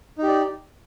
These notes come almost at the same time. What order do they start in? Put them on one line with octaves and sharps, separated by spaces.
D#4 G4 D5